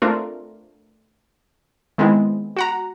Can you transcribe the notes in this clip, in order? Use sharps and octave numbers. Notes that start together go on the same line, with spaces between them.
A3 C4 D4 F4 A#4
D#3 G#3 B3 C4 E4
F#4 F#5 A#5